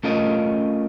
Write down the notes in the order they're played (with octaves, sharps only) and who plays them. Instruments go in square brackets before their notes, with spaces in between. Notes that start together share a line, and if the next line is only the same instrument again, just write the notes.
[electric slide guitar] A3 C#4 F4 A#4 D#5